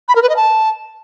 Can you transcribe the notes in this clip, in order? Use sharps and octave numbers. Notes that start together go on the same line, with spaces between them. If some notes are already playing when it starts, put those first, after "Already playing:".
B5
A#4
B4
D#5
A5